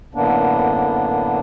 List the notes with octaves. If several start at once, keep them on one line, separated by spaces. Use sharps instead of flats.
F#2 A2 D3 A#3 B3 D4